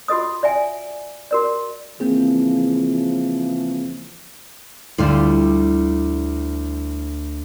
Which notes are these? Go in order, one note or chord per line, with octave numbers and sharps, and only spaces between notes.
F4 F#4 A4 D#5 D#6
D5 E5 G5 G#5
F#4 A#4 D5
C#3 E3 F3 A#3 C4 G#4
D2 G3 E4 F4 E7